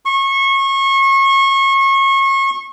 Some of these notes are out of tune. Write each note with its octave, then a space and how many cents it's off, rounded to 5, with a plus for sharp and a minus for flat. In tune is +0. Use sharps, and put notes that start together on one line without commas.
C#6 -30